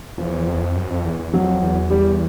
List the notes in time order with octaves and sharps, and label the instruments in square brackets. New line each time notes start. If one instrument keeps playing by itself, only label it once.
[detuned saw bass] E2 [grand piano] F3
[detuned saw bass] F2
E2
F2
F#2
F2
E2
E2
[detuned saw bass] F2 [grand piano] F#3
[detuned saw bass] E2
[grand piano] G3